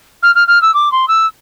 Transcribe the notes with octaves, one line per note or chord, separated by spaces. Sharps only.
F6
F6
F6
E6
D6
C6
E6